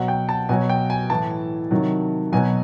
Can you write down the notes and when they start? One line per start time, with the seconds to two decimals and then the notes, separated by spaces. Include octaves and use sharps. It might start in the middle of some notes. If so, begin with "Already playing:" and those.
Already playing: B2 F#3 F#5
0.08 G5
0.29 A5
0.49 B2 F#3 G#5
0.69 G5
0.90 G#5
1.10 A2 E3 A5
1.71 C3 D#3 F#3
2.32 B2 F#3 G#5